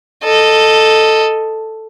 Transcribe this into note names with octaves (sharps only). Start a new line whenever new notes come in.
A4 D#5